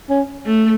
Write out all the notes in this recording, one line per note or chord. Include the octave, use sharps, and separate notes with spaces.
C#4
A3